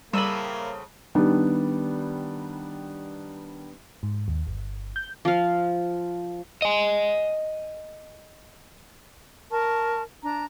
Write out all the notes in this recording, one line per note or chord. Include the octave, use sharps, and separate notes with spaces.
A2 C#3 G3 A#3 C4 B5 E6 D#7
D#3 G3 B3 D4
G#2
D#2
G1
G6
F3 F5
D#5 G#5
A#4 A5 C#6
D4 A#5